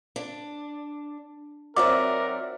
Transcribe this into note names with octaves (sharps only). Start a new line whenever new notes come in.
D4
F#3 C4 D#4 F#4 A#4 D5 E5 D6